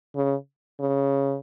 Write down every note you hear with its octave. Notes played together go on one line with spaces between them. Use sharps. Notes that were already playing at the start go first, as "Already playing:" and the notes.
C#3
C#3